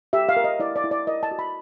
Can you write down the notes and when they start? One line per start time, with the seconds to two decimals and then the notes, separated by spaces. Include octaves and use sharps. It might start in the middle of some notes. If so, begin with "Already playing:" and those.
0.13 G4 E5
0.29 F5
0.37 A#4
0.44 D#5
0.60 E4 D5
0.76 D5
0.84 E4
0.91 D5
1.07 A#4 D#5
1.23 A5
1.31 F#4
1.39 B5